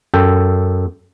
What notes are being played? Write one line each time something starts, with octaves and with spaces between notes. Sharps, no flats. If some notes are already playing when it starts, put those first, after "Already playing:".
F#2 A4 G5